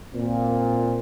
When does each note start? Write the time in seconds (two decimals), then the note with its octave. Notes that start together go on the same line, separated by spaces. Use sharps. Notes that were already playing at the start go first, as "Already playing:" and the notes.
0.13 A#2 C4